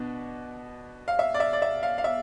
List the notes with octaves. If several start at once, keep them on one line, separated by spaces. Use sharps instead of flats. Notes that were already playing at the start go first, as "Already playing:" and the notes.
Already playing: B2 B3 D4
F5
E5
D5
E5
D5
E5
F5
F5
E5